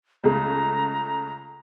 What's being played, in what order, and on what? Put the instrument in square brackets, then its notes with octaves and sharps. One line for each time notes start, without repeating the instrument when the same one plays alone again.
[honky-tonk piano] C#2 C#3 A3 [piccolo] A#5